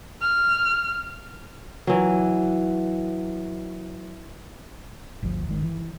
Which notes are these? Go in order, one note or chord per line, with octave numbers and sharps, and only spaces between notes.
F6
E3 F#3
G1 D2 F3
G1 D#3 G#3
E3